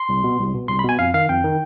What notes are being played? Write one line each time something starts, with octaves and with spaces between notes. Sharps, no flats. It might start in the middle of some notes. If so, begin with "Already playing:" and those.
Already playing: C6
C2
B2
C2
B2
C2 C6
B5
B2 G#5
F2 F5
D#3 F5
F2 G5
D#3